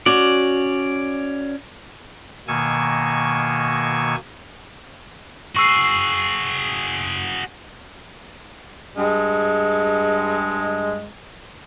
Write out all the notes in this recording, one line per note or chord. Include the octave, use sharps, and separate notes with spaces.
C#4 F#4 D5
B2 D#3 A#3 G#5 C#6 E6
F#4 G#4 C#6 E6 C7
G2 G#3